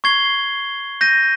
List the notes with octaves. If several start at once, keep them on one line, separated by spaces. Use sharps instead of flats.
C#6 G#6 C7 G7
G6 A#6 D#7